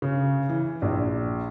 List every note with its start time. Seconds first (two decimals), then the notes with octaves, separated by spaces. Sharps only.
0.02 C#3
0.49 E3
0.82 A#1